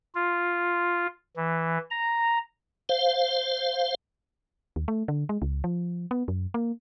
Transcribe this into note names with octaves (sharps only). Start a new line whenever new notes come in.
F4
E3
A#5
C5 F5
D#2
A3
D3
G#3
C#2
F3
B3
F#2
A#3